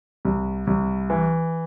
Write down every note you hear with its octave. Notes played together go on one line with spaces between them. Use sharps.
C2
C2
E3